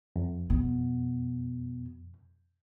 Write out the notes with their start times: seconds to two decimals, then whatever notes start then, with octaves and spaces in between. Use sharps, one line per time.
0.16 F2
0.50 B2